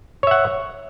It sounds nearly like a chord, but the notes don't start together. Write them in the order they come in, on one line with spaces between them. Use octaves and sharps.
C#5 E5 F#5